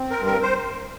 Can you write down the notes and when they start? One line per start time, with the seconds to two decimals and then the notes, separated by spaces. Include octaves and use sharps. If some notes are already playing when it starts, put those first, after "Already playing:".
Already playing: C4
0.11 A#4
0.19 G2
0.26 A#4
0.43 C5